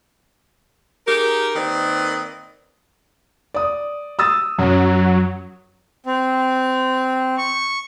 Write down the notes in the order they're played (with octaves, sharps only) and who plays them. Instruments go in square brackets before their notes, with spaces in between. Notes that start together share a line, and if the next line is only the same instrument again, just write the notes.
[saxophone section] D#4 G4 G#4 A#4
D#3 A#3 C4 B4 D5 D#5
[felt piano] D5 D#6
D#6 E6 A6
[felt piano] F#2 [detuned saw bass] F#3
[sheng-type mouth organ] C4
C#6